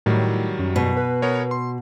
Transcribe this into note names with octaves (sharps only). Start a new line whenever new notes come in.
A2 D#3 F#3 G3
F#2
B2
B4
B3 A#4 C#5
C6